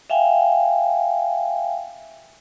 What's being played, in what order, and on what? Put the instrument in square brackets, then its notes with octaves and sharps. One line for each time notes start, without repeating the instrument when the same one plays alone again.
[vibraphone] E5 F5 G5 G#5